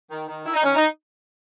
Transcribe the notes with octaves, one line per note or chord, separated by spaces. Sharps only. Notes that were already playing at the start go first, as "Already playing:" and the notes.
D#3
D#3
D#3 E4
D#4
D#3 C#4
D#4